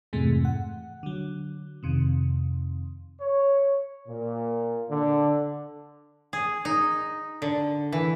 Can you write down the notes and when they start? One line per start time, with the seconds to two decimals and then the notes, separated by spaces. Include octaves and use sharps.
0.13 F2 G#2 C3 E3 G#3 A3
0.45 F#5
1.03 D3 F#3
1.83 F2 C3 D#3
3.21 C#5
4.08 A#2
4.90 D3
6.33 G#4
6.65 D#4
7.42 D3
7.92 E3